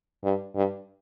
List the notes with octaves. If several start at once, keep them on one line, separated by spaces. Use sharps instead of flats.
G2
G2